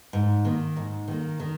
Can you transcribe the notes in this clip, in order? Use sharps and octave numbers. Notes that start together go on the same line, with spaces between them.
G#2
D#3 A#3
G#2
D#3 A#3
D#3